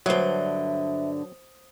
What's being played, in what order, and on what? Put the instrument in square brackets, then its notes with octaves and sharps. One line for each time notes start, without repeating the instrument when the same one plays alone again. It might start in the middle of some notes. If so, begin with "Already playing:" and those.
[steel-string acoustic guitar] G2 D3 [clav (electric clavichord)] F#3 [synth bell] C5 D#6 [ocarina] E5